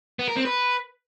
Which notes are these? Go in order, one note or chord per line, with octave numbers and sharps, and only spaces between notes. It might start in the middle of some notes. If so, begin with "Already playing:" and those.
B3
A#4
C4
B4